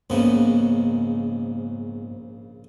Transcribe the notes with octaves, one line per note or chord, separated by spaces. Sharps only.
A#1 G#2 C#3 B3